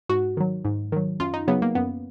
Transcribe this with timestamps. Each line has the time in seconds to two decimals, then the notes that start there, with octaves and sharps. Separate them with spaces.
0.09 G#2 F#4
0.37 D#3 F#3
0.65 G#2
0.92 D#3 F#3
1.20 F#2 F4
1.34 D#4
1.48 C#3 F#3 B3
1.62 A#3
1.75 F#2 B3